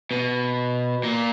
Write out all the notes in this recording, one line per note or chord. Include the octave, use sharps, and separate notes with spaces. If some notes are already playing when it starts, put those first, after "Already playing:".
B2
A#2